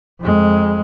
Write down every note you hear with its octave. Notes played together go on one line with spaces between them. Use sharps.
F2 G#3